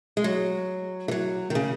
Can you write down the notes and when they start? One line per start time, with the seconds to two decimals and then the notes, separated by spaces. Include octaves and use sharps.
0.17 G#3
0.24 F#3
1.08 E3
1.11 F#3
1.50 D#3
1.55 C#3